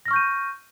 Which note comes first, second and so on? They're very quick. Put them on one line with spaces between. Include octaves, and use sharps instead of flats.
A#6 F6 C#6 G6 D#7